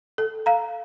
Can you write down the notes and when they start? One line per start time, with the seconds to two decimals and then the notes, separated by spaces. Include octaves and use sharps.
0.18 A4
0.46 F5 A#5